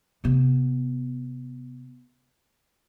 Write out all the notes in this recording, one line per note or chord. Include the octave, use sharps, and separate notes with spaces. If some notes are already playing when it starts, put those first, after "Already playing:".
C3 B3